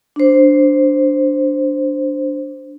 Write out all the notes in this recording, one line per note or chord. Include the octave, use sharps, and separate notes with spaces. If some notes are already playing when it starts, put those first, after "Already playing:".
D4 C5